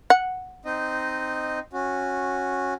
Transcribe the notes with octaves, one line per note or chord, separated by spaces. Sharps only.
F#5
C4 D#4 D#5
C#4 F#4